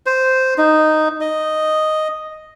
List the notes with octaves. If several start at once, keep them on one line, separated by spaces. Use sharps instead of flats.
C5
D#4
D#5